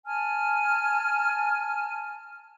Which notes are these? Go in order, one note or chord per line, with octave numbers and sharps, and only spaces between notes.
G#5 A5 F6